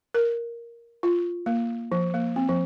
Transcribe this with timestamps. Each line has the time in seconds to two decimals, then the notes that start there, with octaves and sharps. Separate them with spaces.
0.14 A#4
1.03 F4
1.46 A#3
1.92 F3
2.14 A#3
2.36 C4
2.49 F3